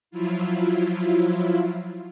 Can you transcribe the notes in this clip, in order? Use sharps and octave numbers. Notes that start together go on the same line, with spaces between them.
F3 F#3 E4 F4